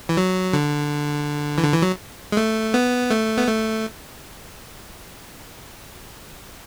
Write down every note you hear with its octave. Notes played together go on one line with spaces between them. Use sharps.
E3
F#3
D3
E3
D3
E3
F#3
G#3
A3
B3
A3
B3
A3